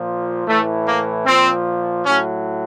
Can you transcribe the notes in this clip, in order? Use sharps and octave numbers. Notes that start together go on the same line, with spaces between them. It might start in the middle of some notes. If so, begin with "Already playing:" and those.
Already playing: A#2 F3
A2 E3 A3
A#3
A#2 F3 C4
A2 F#3 C#4